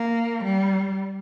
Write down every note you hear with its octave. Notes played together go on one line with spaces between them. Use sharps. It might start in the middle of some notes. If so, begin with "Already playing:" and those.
Already playing: A#3
G3